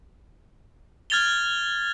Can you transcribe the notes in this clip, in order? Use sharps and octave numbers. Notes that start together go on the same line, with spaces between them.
F6 G#6 A6 F7 G7